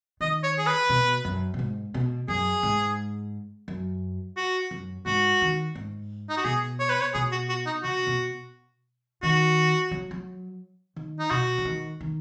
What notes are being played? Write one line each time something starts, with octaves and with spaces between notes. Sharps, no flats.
D#3 D#5
C#5
G#4
B4
B2
F#2
B2
G#2
B2
F#2 G#4
G#2
F#2
F#4
F#2
G#2 F#4
D#3
G#2
D#4
F#4
B2 G#4
C#5
B4
C#5
B2 G#4
F#4
F#4
D#4
C#3 F#4
B2
D#3 F#4
F#3
F#3
D#3
D#4
B2 F#4
C#3
D#3
D#3